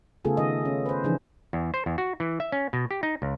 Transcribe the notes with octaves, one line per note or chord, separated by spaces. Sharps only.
C#3 A3 B3 F4 G#4 A4
D#3 D#5
C#4
B4 C5
C#3 E3 F3 D4 D#4 G#4
E2
C5
E2
F#4
E3
E5
C#4
B2
G4
D#4
C#2